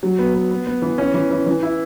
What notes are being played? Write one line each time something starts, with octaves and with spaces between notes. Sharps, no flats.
F#3
B3
B3
B3
B3
E3
C#4
E3
E3
E3
E4